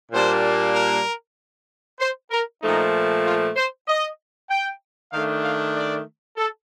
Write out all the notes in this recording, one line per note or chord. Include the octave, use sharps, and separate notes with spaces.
A#2 G3 A#3 D4 C5
A#4
C5
A#4
A#2 F3 A3 D#4
F4
C5
D#5
G5
D#3 A3 D4 F5
F5
D5
A4